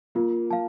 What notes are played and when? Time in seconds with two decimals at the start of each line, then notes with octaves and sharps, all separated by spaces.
0.15 A#3 F4
0.51 F5 A5